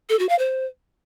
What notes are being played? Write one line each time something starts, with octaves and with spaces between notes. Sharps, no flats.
A4
F#4
F5
C5